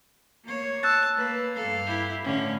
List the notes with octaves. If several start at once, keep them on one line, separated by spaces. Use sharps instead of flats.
A#3 C#5
A5 E6 F#6 A6
A#3 B4
G2 A4 F5
E4 G4
A2 D3 C#4